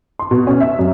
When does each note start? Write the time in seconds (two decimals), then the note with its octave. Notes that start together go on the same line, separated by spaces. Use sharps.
0.19 C6
0.31 B2
0.47 C#4
0.61 E5
0.79 F#2